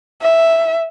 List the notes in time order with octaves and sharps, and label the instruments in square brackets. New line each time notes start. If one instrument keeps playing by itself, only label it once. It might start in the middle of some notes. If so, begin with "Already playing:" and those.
[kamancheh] E5